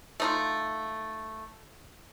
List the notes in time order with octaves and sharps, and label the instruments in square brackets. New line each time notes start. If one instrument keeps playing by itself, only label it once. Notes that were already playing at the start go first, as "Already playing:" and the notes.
[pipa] A3 D#4 F4